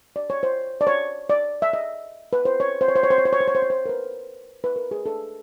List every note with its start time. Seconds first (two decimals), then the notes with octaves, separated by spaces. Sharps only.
0.16 D5
0.30 C#5
0.43 C5
0.81 D5
0.87 C#5
1.30 D5
1.62 E5
1.73 D#5
2.33 B4
2.45 C5
2.60 C#5
2.81 C5
2.88 C#5
2.96 C5
3.03 C#5
3.10 C5
3.18 C#5
3.25 C5
3.33 C#5
3.41 C5
3.48 C#5
3.55 C5
3.62 C#5
3.70 C5
3.86 A#4
3.89 B4
4.64 B4
4.76 A#4
4.91 G#4
5.06 A4